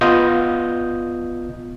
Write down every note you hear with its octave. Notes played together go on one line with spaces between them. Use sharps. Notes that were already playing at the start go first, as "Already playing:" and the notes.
B3 F4 D#5 D#6 G6